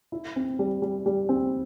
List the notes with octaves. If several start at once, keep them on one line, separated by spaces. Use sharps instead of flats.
E4
C4
G3
G3
G3
C4